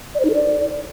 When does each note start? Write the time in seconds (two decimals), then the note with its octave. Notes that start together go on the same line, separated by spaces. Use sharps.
0.15 D5
0.20 C5
0.25 D#4
0.30 A4
0.35 D5